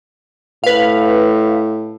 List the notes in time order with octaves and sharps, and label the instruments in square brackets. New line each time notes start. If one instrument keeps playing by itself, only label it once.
[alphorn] A2 [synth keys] B4 F5